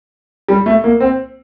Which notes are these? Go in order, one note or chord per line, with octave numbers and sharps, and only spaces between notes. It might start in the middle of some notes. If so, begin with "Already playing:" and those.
G3
A3
A#3
C4